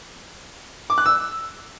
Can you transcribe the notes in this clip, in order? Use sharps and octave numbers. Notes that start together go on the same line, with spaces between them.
D6
F#6
E6